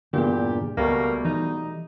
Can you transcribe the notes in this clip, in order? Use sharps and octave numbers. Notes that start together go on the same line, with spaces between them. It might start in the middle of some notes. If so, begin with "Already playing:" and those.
E2 G2 A#2 D3 B3 G4
C#2 B2 G3 A3 A#3
E3 D#4